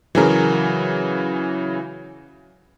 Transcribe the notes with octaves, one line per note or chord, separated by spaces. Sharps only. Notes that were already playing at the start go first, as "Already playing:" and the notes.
C#3 E3 F#3 G#4 A#4